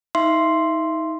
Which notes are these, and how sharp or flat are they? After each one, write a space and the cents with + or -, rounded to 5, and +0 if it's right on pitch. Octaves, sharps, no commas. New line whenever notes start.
D#4 +30 E5 +35 C6 +0